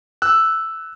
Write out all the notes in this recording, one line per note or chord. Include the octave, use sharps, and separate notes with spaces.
E6 F#6